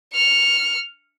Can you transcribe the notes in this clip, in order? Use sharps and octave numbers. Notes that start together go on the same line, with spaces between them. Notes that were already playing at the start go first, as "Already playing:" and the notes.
F6 C#7